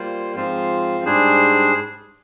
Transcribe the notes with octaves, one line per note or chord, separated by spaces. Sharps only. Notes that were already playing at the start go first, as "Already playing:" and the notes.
Already playing: G3 A#3 F4 C5
G#2 F3 C4 F4 C5
G#2 G3 D4 G#4 C5